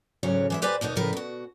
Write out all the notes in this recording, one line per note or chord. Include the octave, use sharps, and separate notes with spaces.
D2 G#2 C#3 F#3 C#5
E3 G#3 E5
G4 B4 C5 D5 G#5
D#2 B2 B3 D#4
A2 C#3 F3 A#4 B4
B2 F#4